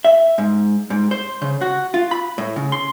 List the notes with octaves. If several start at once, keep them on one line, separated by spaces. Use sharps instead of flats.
E5
G#2
G#2
C5
C#3
F#4
F4
B5
A2
C#3
C6